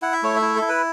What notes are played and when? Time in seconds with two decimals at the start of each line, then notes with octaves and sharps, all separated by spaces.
0.02 E4 F#5
0.13 E5
0.23 A3 C#5
0.36 E5
0.42 E4
0.56 A4
0.62 E4
0.69 B4